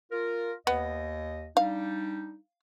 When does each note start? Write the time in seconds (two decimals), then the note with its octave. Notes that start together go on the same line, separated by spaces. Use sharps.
0.12 F4 A#4
0.67 D#2 B3 D#5
1.57 G3 D4 D#4 F5